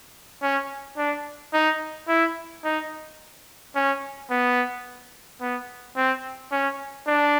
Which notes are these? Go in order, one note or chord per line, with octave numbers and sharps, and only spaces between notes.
C#4
D4
D#4
E4
D#4
C#4
B3
B3
C4
C#4
D4